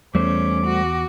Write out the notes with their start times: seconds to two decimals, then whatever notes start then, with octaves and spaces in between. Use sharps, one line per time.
0.15 E2 G3 A3 C#4 C5 D6
0.66 F#4